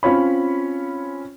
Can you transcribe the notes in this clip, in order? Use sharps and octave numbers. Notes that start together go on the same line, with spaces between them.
C4 C#4 F4 C#5 B5